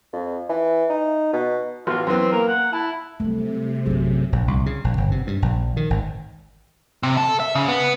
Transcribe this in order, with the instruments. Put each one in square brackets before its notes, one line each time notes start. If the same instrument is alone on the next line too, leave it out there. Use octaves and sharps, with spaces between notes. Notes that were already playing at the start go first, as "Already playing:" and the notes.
[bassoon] F2
E3
D#4
B2
[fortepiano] A1 B3 F#4 [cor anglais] F4
[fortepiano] F#2 E3 B3 [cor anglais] C4
[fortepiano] A#3 [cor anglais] A#4
[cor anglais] F#5
[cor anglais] E4 [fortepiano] A5
[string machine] C3 [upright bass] F#3 G3 [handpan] A3
[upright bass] A#1 F#2 [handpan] F#3 G#4
[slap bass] A#1
C2
C#3
A#1
G1
C3
G2
A#1
D#3
G#1
[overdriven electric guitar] C3
A4
E5
C#3
B3